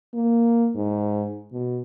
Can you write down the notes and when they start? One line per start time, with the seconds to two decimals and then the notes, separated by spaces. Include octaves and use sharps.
0.14 A#3
0.75 G#2
1.53 B2